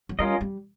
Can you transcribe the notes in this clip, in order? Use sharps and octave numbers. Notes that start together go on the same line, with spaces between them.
F#3
G3 C#4 F4 A#4 D#5
G3